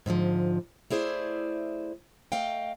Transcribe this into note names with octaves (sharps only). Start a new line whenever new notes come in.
G#2 D3 E3 F3
A3 E4 G#4 C5 D5
A3 D#5 F5 G5